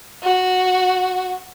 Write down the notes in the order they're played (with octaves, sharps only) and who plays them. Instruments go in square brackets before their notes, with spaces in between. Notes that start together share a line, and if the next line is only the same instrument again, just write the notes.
[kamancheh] F#4